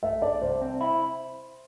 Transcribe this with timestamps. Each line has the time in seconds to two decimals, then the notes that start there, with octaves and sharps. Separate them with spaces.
0.03 A3 E5
0.22 D4 D5
0.42 C2 C5
0.62 C4
0.81 E4